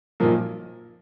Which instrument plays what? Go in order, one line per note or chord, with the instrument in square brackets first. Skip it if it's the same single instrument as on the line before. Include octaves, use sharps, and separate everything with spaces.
[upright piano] B1 A#2 F3 A#3